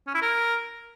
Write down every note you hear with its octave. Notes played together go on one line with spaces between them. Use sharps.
C#4
E4
A#4